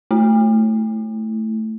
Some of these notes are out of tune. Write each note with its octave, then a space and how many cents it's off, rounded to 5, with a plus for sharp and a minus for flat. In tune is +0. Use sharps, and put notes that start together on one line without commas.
A3 +0 E4 +0